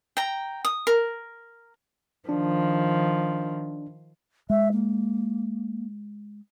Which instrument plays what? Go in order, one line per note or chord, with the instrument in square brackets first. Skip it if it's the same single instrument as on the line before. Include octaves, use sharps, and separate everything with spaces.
[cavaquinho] G5 A#5
D#6
A#4
[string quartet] D#3 F3 [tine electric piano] D4
[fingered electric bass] G#3 [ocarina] E5
[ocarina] A#3